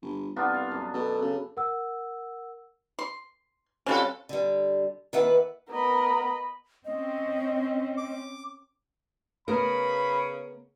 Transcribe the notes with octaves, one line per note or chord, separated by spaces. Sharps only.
G1
C2 B3 D4 F4
F5
F#2
B2 A4
C#3
A#4 F#5 E6
C6
B2 G3 C4 C#4 F4 A4
D3 G3
D#3 E3 A#3 B4 E5 F#5
B3 A#4 D#5 B5
C4 C#4 D#5
D6
C#3 B3 A#4 B5